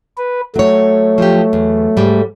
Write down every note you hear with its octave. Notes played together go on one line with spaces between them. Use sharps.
B4
F#3 A3 C#5
F3 G4
E2
G#2 G3